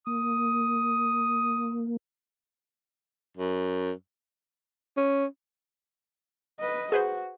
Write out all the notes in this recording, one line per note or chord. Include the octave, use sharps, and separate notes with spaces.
A#3 D#6
F#2
C#4
B4 D#5
F#4 G#4 B4 C5